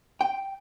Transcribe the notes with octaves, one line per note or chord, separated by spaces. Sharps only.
G5